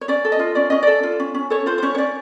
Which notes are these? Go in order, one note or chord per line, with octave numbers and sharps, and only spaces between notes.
C#5
C#4 D5
A4
D#5
F4
C#4 D5
C#4 D#5
A4 D5
F4
C#4
C#4
A4 C#5
F4 C5
C5
C#4 C#5
C#5
C#4 D5